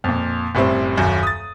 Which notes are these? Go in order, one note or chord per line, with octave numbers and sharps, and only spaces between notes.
F2 A#2
F#1 A2 G3 C4
D#1 F#2
D#6 A6